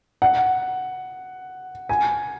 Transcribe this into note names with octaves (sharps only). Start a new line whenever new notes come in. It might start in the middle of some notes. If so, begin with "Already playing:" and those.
F#5
G#5